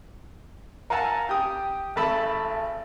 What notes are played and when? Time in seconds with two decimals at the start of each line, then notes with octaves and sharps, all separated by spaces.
0.90 A#4 F5 F#5 G#5 A5 E6
1.29 G4 D#6
1.96 G#1 A3 A5 B5 E6